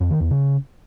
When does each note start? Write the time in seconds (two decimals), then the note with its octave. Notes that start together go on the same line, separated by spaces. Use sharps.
0.01 F2
0.11 D#3
0.21 E2
0.30 C#3